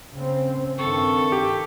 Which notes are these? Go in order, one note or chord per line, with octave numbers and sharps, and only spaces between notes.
C#3 C4
G2 D#3 C4 A4 C#6
G4